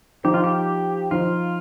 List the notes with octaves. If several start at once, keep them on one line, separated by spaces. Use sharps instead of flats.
F3 D#4 G4 C5
F4
G4
F3 D#4 F4 C5